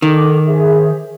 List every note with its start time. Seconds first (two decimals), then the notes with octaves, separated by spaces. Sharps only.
0.02 D#3 A4 D6
0.47 G#4 C5 E5